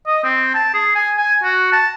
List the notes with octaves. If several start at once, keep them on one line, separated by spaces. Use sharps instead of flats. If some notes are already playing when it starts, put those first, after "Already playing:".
D#5
C4
A5
G#4
G#5
G#5
F#4
A5